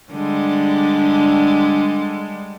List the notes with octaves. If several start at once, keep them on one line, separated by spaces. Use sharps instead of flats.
D3 G3 G#3